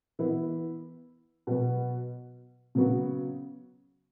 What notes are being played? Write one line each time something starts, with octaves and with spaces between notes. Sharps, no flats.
E3 B3 E4
B2 F#3 B3
C#3 F#3 B3 F#4